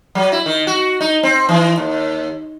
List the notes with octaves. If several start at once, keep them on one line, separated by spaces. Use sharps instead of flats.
F#3
E4
D#3
F#4
D#4
C4
E3
D#2